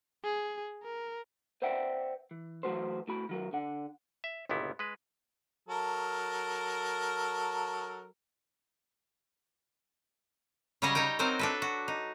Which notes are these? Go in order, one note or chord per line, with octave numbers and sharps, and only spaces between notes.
G#4
A#4
B4 C5 D5 E5 F#5 G5
E3
E3 F#3 A3 F#4 B4 C5
A2 F#4 B5
D#3 F#3 A#4
D3 F#5
E5
G1 C#2 A#2 B3 E4
G#3 B4
F#3 A4 A#4
C#3 F#3 G3 C#5 D#5 G#5
D#4 C#5 D#5 G5
F#3 C4 D#4 A#4 C5
D4 A4 B4
F#4
D#4